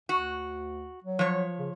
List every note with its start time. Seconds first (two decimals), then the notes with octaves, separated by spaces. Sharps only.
0.09 D2 F#4
1.04 F#3
1.19 F3 C#5
1.59 C#3